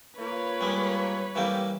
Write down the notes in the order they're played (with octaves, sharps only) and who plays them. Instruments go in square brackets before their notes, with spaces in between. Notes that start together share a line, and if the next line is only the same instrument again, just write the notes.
[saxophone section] A#3 F4 [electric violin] B4 C#5
[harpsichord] G3 G#3
[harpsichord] E3 G3 A#3 [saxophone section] A3 C4 G4